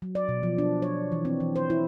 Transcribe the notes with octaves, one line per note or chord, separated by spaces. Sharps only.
F#3
D5
B2
F3
D4
C#5
E3
C4
E3
C5
E4